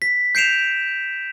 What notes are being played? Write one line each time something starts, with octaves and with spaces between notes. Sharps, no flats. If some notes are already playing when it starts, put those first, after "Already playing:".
B6
G6 C7 D7 E7 F7